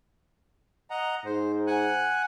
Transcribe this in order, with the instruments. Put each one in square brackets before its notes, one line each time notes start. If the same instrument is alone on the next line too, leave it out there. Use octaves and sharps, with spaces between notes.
[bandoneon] D#5 F#5 A#5
[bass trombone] G#2 [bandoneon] C5
[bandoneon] F#5 G#5 F#6